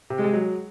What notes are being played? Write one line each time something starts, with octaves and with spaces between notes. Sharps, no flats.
C3
G#3
F#3